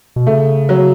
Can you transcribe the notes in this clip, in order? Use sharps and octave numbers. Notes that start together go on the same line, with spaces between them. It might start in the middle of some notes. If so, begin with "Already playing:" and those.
B2
C#3 A3
F#3